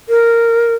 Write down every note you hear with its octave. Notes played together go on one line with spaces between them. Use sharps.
A#4